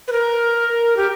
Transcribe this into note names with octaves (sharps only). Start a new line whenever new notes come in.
B4
A#4
G4